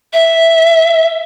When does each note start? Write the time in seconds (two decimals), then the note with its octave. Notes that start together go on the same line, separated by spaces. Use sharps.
0.13 E5